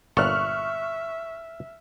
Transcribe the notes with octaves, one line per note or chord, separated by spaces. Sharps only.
G1 A#2 A4 E5 C#6 F6 F#6